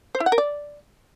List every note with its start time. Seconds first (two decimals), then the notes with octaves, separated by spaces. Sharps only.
0.15 C5
0.20 E4
0.26 F#5
0.32 A#4
0.38 D5